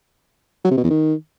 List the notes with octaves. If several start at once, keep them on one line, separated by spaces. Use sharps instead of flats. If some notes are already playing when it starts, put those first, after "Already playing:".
F#3
C3
B2
E2
D#3